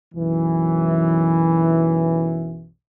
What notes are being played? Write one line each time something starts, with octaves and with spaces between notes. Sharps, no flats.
B1 F#2 E3